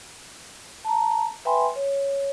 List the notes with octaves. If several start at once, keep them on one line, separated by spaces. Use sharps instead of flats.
A5 A#5
B4 E5 G5 G#5 B5 C6
C#5